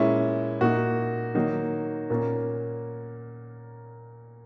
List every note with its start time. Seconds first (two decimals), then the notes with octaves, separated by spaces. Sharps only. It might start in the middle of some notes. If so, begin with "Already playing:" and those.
Already playing: A#2 G#3 C#4 E4
0.61 A#2 A#3 D#4 F#4
1.35 D#3 F#3 A#3 D#4
2.10 A#2 A#3 C#4